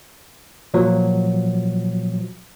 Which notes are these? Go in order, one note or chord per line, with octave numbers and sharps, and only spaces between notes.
A#2 F3 F#3